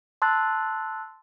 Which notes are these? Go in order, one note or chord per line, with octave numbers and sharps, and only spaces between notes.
A5 C6 E6 F#6 A6